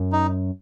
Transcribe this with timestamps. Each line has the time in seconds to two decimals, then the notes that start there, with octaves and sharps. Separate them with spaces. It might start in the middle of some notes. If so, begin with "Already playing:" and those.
Already playing: F#2
0.12 D#4